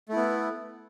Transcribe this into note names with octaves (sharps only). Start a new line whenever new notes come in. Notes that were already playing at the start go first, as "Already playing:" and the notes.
A3 B3 E4